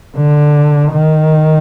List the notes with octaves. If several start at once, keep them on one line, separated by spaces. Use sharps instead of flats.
D3
D#3